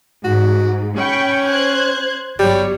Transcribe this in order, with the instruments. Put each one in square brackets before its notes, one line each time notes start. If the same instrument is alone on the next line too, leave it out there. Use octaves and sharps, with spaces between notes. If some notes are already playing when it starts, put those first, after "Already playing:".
[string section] G#2 [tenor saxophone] F#4
[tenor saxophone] C#4 [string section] G5 B5 C#6
[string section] C5 F#6 G#6
[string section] G1 F#3 C#5 [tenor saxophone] G3